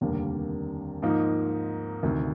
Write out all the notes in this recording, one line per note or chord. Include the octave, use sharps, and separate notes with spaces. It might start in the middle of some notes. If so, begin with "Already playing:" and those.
F1 D#2 D3 G3 A#3
G#2 F3 A#3 D#4
D2 C3 D#3